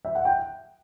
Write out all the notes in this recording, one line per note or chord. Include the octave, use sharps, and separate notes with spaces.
E5
F#5
G5